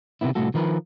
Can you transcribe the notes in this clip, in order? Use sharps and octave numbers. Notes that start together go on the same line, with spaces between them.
C3 D#3 B3 E4
C2 A2 A3 F#4 A4
D#3 F3 A#4 B4